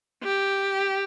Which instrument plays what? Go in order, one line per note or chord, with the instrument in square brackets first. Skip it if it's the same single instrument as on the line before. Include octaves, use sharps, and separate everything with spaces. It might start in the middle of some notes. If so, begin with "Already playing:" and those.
[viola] G4